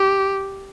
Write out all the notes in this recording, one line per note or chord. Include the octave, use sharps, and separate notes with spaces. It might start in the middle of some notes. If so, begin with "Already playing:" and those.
Already playing: G4